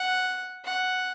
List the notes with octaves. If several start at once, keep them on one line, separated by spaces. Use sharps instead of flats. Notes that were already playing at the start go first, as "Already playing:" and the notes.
Already playing: F#5
F#5